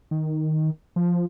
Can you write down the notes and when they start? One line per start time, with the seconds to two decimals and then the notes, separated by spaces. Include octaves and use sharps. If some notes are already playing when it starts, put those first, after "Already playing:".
0.11 D#3
0.96 F3